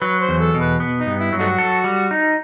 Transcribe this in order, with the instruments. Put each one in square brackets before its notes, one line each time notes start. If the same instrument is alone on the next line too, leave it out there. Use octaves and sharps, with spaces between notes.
[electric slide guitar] F#3 [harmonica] B4
[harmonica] C5
[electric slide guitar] E2
[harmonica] A4
[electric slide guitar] B2
[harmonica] B4
[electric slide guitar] B3
[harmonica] D#4
[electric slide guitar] G2
[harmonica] E4
[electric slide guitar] F#3
[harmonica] A3 D#4 F#4
[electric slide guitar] A4
G3
D#4